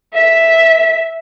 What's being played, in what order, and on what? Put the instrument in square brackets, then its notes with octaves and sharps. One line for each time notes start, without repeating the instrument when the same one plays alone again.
[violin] E5 B6